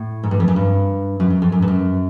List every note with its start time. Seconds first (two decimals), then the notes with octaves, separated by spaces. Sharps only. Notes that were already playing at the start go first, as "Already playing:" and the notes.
Already playing: A2
0.23 G#2
0.31 G2
0.40 F2
0.48 F#2
0.56 G2
1.20 F#2
1.30 F#2
1.42 F2
1.52 F#2
1.62 G2
1.68 F#2